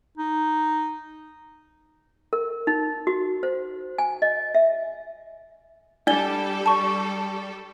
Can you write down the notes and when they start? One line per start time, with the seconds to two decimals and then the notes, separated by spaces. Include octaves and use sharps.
0.17 D#4
2.33 A#4
2.67 D#4
3.07 F#4
3.43 C5
3.98 G#5
4.22 D#5
4.55 E5
6.07 G3 D4 A4 D5 G7
6.66 A5 C#6